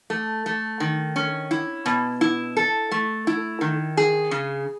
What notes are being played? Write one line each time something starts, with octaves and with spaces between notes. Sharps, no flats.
A3
A3
D#3
C#4
E4
B2
E4
A4
A3
E4
D#3
G#4
C#3